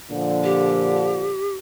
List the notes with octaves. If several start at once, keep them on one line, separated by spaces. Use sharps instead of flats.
A#2 D3 F3
G4